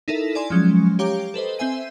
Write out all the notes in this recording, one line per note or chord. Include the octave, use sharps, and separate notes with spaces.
D#4 E4 A4 A#4 E5
D5 G#5 C6
F3 F#3 G#3 C#4
G4 C#5 F5 G5 A#5 D6
A4 B4 C5 D#5
C4 C5 E5 G#5 D#7